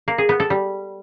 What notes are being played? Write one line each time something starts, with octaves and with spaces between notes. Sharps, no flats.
A#3
G#4
B3
A4
G3